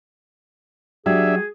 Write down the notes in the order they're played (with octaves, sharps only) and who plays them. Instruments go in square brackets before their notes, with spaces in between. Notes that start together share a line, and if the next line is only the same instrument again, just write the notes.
[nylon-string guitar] F#3 G4 [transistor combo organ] D4 E5 [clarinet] G#4